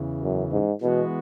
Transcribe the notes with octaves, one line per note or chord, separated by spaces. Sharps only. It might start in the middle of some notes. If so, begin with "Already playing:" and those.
Already playing: E2 C#3 E3
F#2
G#2
B2 E3 G#3 B3 F#4